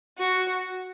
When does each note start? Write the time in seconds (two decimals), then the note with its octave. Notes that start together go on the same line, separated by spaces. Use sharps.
0.18 F#4